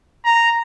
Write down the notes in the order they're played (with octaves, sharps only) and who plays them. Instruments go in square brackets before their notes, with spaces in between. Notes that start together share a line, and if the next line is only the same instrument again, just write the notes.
[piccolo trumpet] A#5